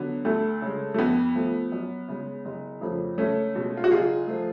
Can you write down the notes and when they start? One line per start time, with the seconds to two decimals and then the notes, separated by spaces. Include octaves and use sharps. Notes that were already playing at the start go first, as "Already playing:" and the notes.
Already playing: D3 F#3 B3
0.25 D2 A3
0.62 C#3 G#3
0.94 A3
0.98 F2 B3
1.35 F3 A3
1.72 F#2
2.08 C#3 G#3
2.45 F#1
2.81 F2 C#3 F3 A3
3.18 C#2 A3 C#4
3.55 B2 G#3
3.77 F4
3.84 F#4
3.91 F#1 F4 G#4
4.28 F3 A3